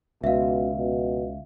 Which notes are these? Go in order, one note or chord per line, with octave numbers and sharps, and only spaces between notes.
C#2 B2 E5 F5
B2